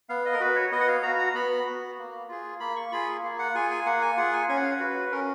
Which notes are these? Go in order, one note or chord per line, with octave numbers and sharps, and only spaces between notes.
B3 F5
D#5
A#4
F#4 B4
C#5
B3 D#5
F#5
F5
F#4 A#5
A#5
B3 B5
F#4
A#3
F4 G#4
A#3 B5
C#6
F4 G#4 B5
A#3
F#5
F4 G#4 G#5
G#5
A#3 F#5
G#5
F4 G#4 F#5
G#5
C#4 G#5
F#5
F5
F#5
F#4 B4
C#4 A#4